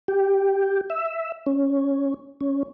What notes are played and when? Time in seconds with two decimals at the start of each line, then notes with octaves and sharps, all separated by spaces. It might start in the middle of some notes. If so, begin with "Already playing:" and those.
0.08 G4
0.90 E5
1.46 C#4
2.41 C#4